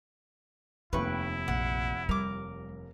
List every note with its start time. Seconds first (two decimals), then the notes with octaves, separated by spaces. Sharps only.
0.93 F1 D#2 G#3 D#4 E4 B4 G5 C#6
1.48 A#1 F#5
2.09 G3 A#4 D6